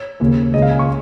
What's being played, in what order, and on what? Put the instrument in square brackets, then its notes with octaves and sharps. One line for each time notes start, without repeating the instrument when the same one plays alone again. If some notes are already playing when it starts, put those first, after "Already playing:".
Already playing: [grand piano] C#5
D#2 C#3 A#3
C#2 C#3 A#3 D#5
F5
G#5
C#6